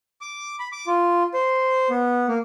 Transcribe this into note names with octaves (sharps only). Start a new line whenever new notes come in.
D6
B5
D6
F4
C5
B3
A#3